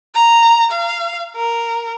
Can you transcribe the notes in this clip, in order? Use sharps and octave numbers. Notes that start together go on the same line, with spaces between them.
A#5
F5
A#4